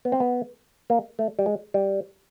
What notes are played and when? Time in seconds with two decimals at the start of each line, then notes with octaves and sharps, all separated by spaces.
0.05 B3
0.12 C4
0.20 B3
0.90 A#3
1.19 A3
1.39 G3
1.46 G#3
1.74 G3